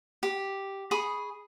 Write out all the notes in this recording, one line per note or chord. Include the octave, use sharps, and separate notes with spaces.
G4
G#4 B5 C#6 D#6